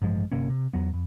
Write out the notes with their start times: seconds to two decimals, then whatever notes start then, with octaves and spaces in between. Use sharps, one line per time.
0.02 A1 G2 F3 G#3
0.32 G1 C3 A#3 C#4
0.50 C3
0.73 E2 F#3 B3
0.94 F2